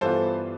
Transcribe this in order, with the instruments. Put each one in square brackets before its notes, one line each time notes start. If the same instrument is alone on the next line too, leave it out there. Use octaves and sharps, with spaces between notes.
[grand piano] G2 E3 B3 F4 A4 C5